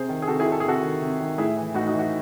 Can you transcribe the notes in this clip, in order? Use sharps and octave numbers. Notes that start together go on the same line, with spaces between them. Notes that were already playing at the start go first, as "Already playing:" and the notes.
Already playing: C3 G#4 C5
D#3
G#4
C3 F#4 A4
E4 G#4
D#3
A4
G#4
C3 F#4 A4
D#3
C3
D#3
A2 E4 G#4
E3
A2 D#4 F#4
D#4 F#4
E3
D#4 F#4